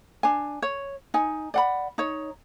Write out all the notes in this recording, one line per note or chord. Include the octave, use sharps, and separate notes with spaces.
D4 G#5
C#5
D#4 G#5
D5 F#5 B5
D#4 C#5